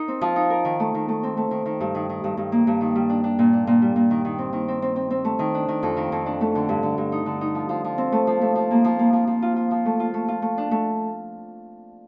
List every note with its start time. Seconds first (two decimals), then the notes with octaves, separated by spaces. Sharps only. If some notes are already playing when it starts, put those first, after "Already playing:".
Already playing: D#4 A#4
0.08 C4
0.21 F3
0.36 D#4
0.50 A#4
0.65 D#3
0.80 A3
0.94 D#3
1.08 A3
1.23 C4
1.37 A3
1.51 D#3
1.66 D#3
1.80 G2
1.95 D#3
2.09 D#3
2.24 G2
2.37 G2
2.52 A#3
2.67 G2
2.81 D#3
2.95 G3
3.09 D4
3.24 D4
3.39 A#2
3.53 D4
3.67 A#2
3.82 G3
3.96 A#2
4.11 D#3
4.25 D#3
4.38 C4
4.53 D#3
4.68 C4
4.82 C4
4.96 C4
5.10 C4
5.25 A3
5.39 D#3
5.55 D4
5.68 D#3
5.83 F2
5.96 D#3
6.12 F2
6.26 D4
6.41 A3
6.55 D3
6.69 G2
6.83 D3
6.98 G2
7.12 D#4
7.26 D3
7.41 D#4
7.55 F3
7.69 F3
7.84 F3
7.98 C4
8.12 A3
8.27 F3
8.41 A3
8.55 F3
8.71 A#3
8.84 F3
8.99 A#3
9.13 F3
9.27 F3
9.42 F4
9.56 F4
9.71 F3
9.86 A3
10.00 F4
10.14 A3
10.28 F4
10.42 A3
10.58 D4
10.71 A3